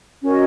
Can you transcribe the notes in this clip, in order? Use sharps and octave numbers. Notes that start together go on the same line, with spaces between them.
C#4 F#4 A#4 D#5